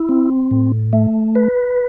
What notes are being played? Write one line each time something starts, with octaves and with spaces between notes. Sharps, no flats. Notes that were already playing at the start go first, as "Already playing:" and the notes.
Already playing: E4
C4
A2
A3
B4